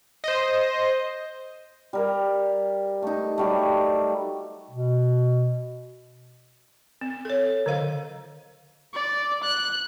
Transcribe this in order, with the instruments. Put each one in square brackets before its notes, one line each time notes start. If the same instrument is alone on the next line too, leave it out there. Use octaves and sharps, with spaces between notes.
[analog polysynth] C5 D#5
[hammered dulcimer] G3 A#4 E5
A3 D#4
F#3 G3 A3
[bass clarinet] B2
[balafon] C4
A4 C#5
D3 F#3 C5 F5
[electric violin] D5
F#6